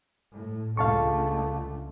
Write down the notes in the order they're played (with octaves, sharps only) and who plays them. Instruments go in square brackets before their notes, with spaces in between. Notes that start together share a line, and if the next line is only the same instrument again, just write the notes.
[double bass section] A2
[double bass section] C#2 D3 A3 [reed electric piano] F5 A5 C#6